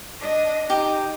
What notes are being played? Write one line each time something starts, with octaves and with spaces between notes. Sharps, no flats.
D4 D#5
D#4 G4